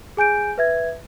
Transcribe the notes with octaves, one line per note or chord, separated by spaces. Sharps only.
G#4 G#5 G6 D7
B4 E5 G#6